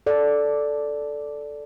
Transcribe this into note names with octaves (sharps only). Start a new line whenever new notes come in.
A4 D5